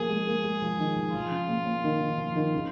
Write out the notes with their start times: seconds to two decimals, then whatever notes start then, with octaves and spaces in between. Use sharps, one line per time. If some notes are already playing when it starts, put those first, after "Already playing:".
Already playing: F3 A#3 G#4
0.10 G#3
0.27 A#3
0.44 G#3
0.62 F3
0.79 D#3
0.96 F3
1.14 F3 F4
1.31 C#3
1.48 A#2
1.66 A#2
1.84 D#3
2.00 D#3
2.18 F3
2.35 D#3
2.53 C#3